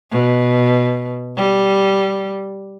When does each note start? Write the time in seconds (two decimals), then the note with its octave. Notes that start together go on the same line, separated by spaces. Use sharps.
0.11 B2
1.37 G3